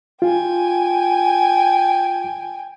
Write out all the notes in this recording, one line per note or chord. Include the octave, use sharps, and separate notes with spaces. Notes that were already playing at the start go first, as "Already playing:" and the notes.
F4 G5 G#5